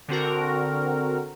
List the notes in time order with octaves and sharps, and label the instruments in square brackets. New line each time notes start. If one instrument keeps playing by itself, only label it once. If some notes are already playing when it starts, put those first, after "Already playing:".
[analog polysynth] D3 C4 F#4 A#4